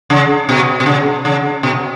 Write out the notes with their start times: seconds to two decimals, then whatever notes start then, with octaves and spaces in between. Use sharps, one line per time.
0.10 C#3
0.49 B2
0.80 B2
0.86 C#3
1.25 C#3
1.63 B2